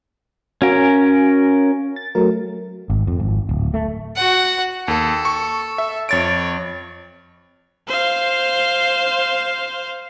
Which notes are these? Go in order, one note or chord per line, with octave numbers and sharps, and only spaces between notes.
C#4 F#4 A#4 F5 G#5
A6
F#3 A3 A#4
G#1
F2
G#1
D1
A3
F#4 F#5
D#2 A4
C#6
E5
F2 C#5 A6 D7
C5 F5